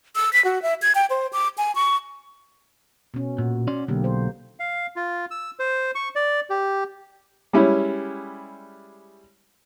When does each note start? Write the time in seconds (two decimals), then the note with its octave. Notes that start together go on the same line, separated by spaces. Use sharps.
0.16 E6
0.33 B6
0.45 F#4
0.62 E5
0.82 G#6
0.95 G5
1.10 C5
1.33 D6
1.58 G#5
1.75 C#6
3.14 B2 C#4
3.38 A#2 F#4
3.67 C#4 D5 C6
3.88 B1 D3 A#3 G4
4.04 C5
4.60 F5
4.96 F4
5.31 E6
5.59 C5
5.95 C#6
6.15 D5
6.50 G4
7.53 G3 G#3 C#4 E4